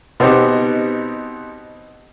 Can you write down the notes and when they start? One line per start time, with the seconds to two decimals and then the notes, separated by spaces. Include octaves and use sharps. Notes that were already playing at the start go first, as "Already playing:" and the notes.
0.20 B2 B3 C4 D#4 G4